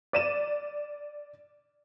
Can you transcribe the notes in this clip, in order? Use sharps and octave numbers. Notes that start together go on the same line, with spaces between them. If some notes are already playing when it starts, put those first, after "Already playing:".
D5 D#7 E7